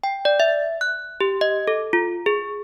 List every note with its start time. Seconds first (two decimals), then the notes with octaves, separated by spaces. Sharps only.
0.04 G5
0.25 D5
0.40 E5
0.81 F#6
1.21 G4
1.41 D#5
1.67 A4
1.93 F4
2.26 G#4